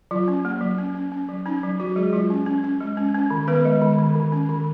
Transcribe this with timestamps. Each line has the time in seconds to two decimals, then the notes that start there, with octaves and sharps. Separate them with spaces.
0.11 F#3 F4
0.28 C#4
0.45 A#3
0.61 F#3
0.78 C#4
0.95 C#4
1.12 C#4
1.28 F#3
1.46 C#4 D#4
1.63 F#3
1.80 F#3 F#4
1.96 F#3 G#3 G#4
2.13 F#3 F4
2.30 C#4
2.46 C#4
2.64 C#4
2.81 G#3
2.97 C#4
3.15 C#4
3.30 D#3
3.47 D#3 B3 B4
3.65 G#3
3.82 D#3
3.98 D#3
4.16 D#3
4.32 C#4
4.49 D#3